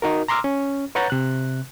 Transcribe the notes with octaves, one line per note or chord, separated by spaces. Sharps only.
D#4 F#4 A#4
A#5 C6 D6 E6 F6
C#4
B4 C#5 F#5 A#5 G6 A6
C3 F#6